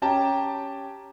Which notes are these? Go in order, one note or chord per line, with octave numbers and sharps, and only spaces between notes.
C#4 G4 G5 A5 A#5